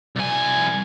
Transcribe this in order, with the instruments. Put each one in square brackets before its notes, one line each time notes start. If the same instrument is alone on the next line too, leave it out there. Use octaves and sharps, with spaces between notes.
[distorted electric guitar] C2 G#5